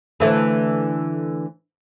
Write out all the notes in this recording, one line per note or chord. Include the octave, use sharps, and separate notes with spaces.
D3 E3 A3